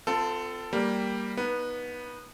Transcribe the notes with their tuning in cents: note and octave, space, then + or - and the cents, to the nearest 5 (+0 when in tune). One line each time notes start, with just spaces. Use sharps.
C4 -35 F4 +0 A4 +10
G3 +0 A#3 +0
B3 -15 D#4 +0